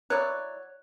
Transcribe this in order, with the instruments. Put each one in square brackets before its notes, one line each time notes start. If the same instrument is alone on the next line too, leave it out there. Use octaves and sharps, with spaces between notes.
[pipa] F#3 E4 D5 [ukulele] C#5 [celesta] F#6